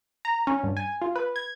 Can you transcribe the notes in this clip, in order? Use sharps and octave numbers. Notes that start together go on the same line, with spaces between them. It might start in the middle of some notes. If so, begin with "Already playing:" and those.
A#5
C#4
G2
G#5
F4
B4
G#6